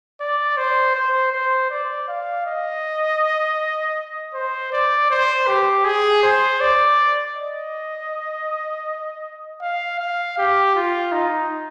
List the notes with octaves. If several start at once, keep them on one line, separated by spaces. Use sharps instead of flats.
D5
C5
C5
C5
D5
F5
D#5
C5
D5
C5
G4
G#4
C5
D5
D#5
F5
F5
G4
F4
D#4